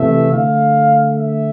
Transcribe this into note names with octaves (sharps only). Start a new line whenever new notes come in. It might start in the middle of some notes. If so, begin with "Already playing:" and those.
Already playing: C3 E3 A3 E5
D3 A3 F5
E5